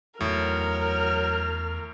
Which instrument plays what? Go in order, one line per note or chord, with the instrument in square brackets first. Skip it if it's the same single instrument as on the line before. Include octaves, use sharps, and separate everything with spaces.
[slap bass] E2 D#3 [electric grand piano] A2 [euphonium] F#3 [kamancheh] A#4 F6